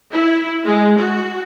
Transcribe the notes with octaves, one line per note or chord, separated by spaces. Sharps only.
E4
G#3
F#4